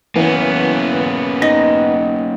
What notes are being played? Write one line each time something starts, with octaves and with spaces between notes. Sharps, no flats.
E3 A#3 B3 C#4
D#4 A#6